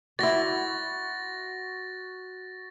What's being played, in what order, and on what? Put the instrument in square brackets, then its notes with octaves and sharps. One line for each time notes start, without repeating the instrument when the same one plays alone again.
[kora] E4 D5 [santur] F#4 C6 [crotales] A6 A#6